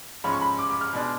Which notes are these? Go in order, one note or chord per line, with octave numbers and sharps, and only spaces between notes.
G#2 F3 G#3 C#4 B5
C#6
B5
D6
D6
F6
B2 G#3 D4